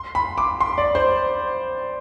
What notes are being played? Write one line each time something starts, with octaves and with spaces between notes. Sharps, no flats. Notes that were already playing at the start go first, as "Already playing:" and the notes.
Already playing: C6
B5
D6
C6
D5
C5